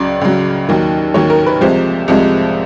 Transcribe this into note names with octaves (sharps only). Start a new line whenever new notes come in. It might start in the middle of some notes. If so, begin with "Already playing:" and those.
Already playing: C#2 C#3 F#3 D5
C#2 C#3 F#3
D#2 D#3 F#3
D#2 D#3 F#3 C#5
A#4
B4
C2 C3 F3 G#3 C5
C2 C3 F3 G#3